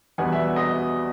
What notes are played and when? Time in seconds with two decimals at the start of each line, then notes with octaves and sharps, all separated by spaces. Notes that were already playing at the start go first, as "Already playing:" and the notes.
0.18 E2 B2 G3 B3 D4 F#5 G#5
0.32 E5
0.47 E5
0.56 D#5